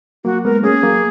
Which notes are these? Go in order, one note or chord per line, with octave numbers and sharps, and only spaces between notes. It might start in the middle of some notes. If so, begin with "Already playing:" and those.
F#3 A#3 F#4
G#3 B3 A#4
A#3 C#4 G#4
F#3 A#3